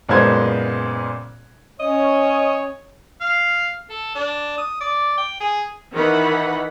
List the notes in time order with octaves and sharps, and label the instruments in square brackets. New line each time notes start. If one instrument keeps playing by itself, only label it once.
[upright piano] F#1 A#2 G#3 B3 C5 G#6
[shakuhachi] C#4 [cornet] C#5 [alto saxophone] D#5
[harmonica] F5
A4
D4
D#6
D5
G5
G#4
[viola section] D#3 E3 D#4 F#5 B5